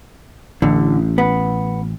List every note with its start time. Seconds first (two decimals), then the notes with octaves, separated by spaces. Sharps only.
0.62 A1 D3
1.18 B3